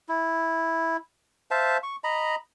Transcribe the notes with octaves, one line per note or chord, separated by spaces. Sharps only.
E4
C5 E5 F5 A5
C#6
D#5 A#5 B5